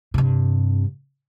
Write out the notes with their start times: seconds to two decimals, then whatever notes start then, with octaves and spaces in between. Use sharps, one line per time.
0.14 G2 C3